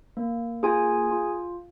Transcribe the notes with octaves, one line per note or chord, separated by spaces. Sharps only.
A#3
F4 G#4 G#5
F4